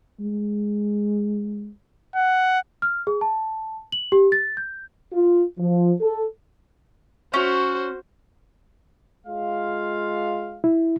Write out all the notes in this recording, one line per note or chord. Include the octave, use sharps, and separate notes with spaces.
G#3
F#5
F6
G#4
A5
F#7
G4
A6
G6
F4
F3
A4
C#4 F#4 C5
G#3 F4 F5
E4